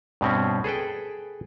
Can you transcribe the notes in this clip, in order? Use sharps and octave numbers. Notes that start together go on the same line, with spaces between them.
G2 B2 C4 C#4
G#4 A4 B4 G5